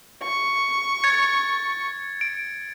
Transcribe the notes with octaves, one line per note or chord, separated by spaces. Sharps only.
C#6
G#6 A6 C#7
D7